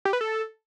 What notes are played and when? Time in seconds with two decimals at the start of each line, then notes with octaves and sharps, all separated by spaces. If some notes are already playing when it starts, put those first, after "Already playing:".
0.05 G4
0.13 B4
0.21 A4